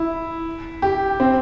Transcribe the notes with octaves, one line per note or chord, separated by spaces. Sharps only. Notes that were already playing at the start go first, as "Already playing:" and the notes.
Already playing: E4
G4
C4